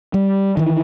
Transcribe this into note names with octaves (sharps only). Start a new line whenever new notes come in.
G3
D#3 E3